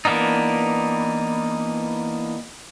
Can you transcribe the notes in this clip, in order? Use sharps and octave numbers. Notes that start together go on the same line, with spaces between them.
E3 A#3 B3 D4 D#4